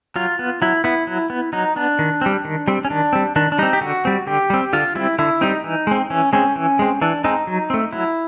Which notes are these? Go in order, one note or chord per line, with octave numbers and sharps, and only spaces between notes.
F#3 F4
B3
F#3 E4
B3 E4
F#3
B3
F#3 D#4
B3 D4
D#3
G3 C4
D#3
G3 C4
C#4
D#3 D4
G3 C4
D#3 D4
D4
G3 C4 D#4
G4
D3 F#4
G3 C4
D3 G4
G3 C4
D3 F4
G3 C4 E4
D3 E4
G3 C4 D#4
E3
G#3 C4
E3 C#4
G#3 C4 C#4
E3
G#3 C4
E3 D4
G#3 C4 D#4
F#3
A3 C4
F#3 E4